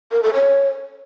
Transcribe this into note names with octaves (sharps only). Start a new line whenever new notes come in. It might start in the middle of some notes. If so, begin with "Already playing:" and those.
A#4
A4
C#5